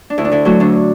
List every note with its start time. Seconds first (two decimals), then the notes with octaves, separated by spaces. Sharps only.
0.10 D4
0.18 D2 E4
0.25 D4
0.32 D3 E4
0.45 F#3 A3 F#4
0.60 D2 D4